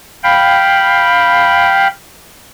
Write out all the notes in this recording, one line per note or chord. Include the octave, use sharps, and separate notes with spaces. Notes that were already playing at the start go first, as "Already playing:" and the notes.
F5 G5 B5